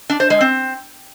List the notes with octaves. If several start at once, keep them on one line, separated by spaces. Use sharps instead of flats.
D4
C5
G#3
C4